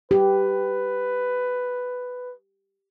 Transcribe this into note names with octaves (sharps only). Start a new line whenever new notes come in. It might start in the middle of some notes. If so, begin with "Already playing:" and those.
G4 B4